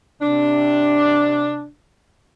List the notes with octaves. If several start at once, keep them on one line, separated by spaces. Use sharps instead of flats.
C3 D4